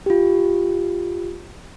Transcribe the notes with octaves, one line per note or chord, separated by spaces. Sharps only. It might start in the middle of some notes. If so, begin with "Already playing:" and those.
F4 G4